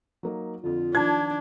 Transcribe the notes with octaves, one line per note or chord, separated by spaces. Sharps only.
F#3 A#3 D#4
F2 D3 F4
D#3 F3 D4 A5 G#6